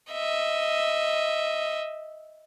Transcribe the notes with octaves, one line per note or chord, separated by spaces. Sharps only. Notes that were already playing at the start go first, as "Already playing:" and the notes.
D#5 E5